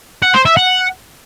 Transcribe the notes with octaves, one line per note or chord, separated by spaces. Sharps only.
F#5
C5
E5
F#5